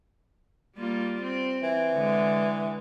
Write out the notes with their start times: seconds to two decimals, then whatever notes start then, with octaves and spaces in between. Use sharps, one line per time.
0.77 G3 A#3 F4
1.21 C4
1.63 E3
1.94 D3 G#3